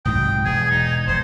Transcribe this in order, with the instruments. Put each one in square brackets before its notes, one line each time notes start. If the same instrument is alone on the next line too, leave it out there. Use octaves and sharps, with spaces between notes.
[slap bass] C2 G#2 F#3 [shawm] G5 [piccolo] D#6
[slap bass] E1 [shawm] G#4 [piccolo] G#6
[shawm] D#4
[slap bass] E1 [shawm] C5